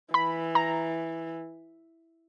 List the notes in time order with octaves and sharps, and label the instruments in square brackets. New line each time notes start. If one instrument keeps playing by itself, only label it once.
[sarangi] E3 [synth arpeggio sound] B5
[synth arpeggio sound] A#5